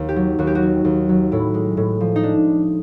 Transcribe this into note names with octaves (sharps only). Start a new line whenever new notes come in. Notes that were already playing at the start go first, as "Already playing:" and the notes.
Already playing: D#2
G4
F#3
D#2 F#4
G4
F#4
F#3
D#2
F#3
A2 E4
G#3
A2
F3
D#4
D4